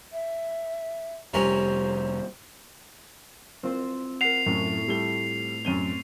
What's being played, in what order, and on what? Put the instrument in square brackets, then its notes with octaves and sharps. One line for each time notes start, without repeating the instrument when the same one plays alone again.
[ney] E5
[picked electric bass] F1 G3 [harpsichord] C3 C#4 A#4 [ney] C5
[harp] C4 F4 C5
[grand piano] A#4 F#5 [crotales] C7 F7
[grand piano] F#2 [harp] A2
[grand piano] G3 A3 G7
[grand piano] F#2 D#7 G7 [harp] C4